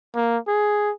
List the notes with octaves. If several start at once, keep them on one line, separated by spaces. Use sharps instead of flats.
A#3
G#4